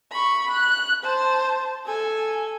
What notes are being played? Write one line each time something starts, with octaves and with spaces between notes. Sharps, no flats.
B5 C#6
F#6
C5 A5
A4 G#5